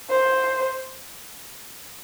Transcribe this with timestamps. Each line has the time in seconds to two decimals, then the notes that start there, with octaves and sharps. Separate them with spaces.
0.10 C5